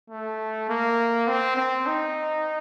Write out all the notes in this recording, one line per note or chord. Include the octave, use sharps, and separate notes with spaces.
A3
A#3
C4
C4
D#4